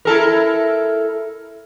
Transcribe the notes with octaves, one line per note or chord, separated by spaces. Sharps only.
E4 A4 A#4